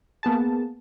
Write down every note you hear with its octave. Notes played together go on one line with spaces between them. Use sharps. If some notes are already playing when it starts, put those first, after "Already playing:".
A#3 B3 G#4 A5